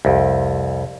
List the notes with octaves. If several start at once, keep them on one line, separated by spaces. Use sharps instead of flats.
C2 F2